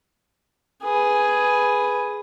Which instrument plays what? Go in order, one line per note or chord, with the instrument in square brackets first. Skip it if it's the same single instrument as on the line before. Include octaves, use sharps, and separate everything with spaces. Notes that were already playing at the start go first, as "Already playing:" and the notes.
[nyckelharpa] G#4 B4